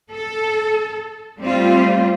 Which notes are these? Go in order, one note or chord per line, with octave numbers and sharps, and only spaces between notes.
A4
G3 A3 C4 F4